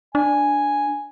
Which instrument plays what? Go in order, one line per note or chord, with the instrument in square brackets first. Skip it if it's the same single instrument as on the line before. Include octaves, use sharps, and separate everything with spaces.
[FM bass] D4 [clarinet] G#5